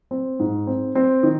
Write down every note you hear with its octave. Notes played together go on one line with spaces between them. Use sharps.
C4
G#2
C4
C4
D#3